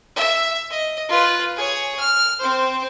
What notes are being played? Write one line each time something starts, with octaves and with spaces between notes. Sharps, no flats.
E5
D#5
F4 B4
G#4 C#5
F6
C4 C5